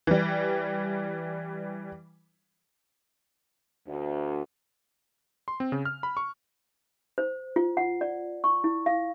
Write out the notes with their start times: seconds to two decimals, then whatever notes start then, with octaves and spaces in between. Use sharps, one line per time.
0.07 E3 G3
3.87 D2
5.48 C6
5.60 C4
5.72 C#3
5.85 F6
6.03 B5
6.17 C#6
7.18 C5
7.56 F4
7.77 F#5
8.01 D5
8.44 C#6
8.64 E4
8.86 F5